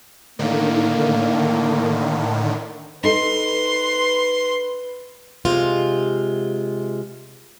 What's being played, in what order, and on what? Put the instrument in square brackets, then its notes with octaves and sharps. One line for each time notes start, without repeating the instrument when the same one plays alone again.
[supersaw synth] A2 D3 D#3 [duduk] A#3
[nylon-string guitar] D#4 A4 [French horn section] B4 [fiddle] C6
[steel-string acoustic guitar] C3 G#3 F4